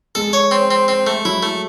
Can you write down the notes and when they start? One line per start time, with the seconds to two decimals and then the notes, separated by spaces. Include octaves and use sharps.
0.15 G#3 A4
0.33 C#5
0.51 C4
0.71 C4
0.88 C4
1.07 A3
1.25 F#3 E4
1.43 A3